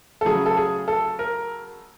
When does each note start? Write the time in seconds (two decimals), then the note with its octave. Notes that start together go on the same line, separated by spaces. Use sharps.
0.21 A4
0.25 C#3 F#3 A3 G#4
0.46 A4
0.57 G#4
0.88 A4
1.19 A#4